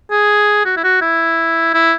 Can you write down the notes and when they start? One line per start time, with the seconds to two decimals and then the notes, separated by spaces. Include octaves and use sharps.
0.11 G#4
0.66 F#4
0.77 E4
0.84 F#4
1.02 E4
1.74 E4